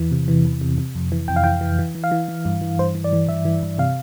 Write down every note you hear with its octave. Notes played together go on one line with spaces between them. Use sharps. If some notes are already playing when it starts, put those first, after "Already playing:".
Already playing: E2 E3
C3
E3
E2
C3
C3
F2
E3
F2 G5
F5
E3 G5
E3
E3
E3
F5
E3
E3
G2
E3
G2 C5
E3
D5
E3
G2 E5
E3
G2
C3 F5